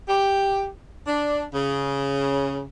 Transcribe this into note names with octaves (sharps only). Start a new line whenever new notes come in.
G4
D4
C#3